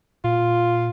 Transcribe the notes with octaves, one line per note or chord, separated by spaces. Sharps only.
A#2 F4